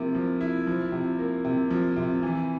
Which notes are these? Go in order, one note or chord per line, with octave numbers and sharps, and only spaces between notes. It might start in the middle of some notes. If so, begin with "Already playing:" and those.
Already playing: C3 F3 A#3 E4
F3
E4
F3
C3
A#3
C3
F3
C3
E3